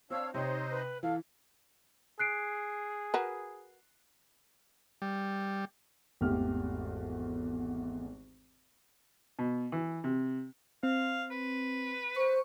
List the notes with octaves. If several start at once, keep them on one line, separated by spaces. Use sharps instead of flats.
C4 D4 C#5 F5 E6
C3 C4 D#4 C5 C#5 D#5
B4
E3 A4 F5
G#4 F#6 C7 D7
F#4 A#4 B4
G3
G#1 E2 A3 G4 F6
B2
E3
C3
C4 F5
B4
C5 C#6